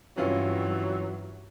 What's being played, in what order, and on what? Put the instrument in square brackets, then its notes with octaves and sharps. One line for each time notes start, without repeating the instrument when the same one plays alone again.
[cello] G2 [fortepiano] C3 C#4 F4 [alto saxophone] E3 [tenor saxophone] F#3